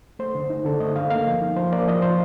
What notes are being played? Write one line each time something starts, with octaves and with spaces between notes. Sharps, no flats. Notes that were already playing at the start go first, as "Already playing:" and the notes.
A3 C5
D3
D#4
D3 A4
A3 D#5
D3 F5
A#3 F5
F3
D#4
F3 C5
A#3 D5
F3 D#5
F3 C5